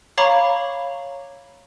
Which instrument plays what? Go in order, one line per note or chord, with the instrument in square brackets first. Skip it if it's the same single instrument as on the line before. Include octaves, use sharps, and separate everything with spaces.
[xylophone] C#5 F5 A#5 B5 C#6 D6